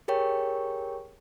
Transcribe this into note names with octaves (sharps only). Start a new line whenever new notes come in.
G4 G#4 A#4 C#5 G5 C#6